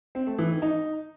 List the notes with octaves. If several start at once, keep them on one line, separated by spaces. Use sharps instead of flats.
C4
A3
E3
D#3
D#4